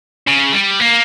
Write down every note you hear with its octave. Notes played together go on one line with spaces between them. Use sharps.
C#3
G3
A#3